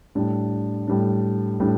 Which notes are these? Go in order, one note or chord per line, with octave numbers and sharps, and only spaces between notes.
A2 G3 D4
A2 G3 D4
A2 G3 D4